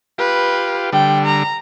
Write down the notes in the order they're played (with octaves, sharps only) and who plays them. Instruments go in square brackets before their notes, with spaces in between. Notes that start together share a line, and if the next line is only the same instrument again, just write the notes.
[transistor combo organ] F4 G4 [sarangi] B4
[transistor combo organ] D3 G3 [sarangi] G5
[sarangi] A#5